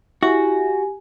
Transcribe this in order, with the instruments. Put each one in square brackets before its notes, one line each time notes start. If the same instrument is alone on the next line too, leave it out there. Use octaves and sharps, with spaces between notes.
[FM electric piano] E4 [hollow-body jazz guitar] F#4 [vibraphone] G4 G#5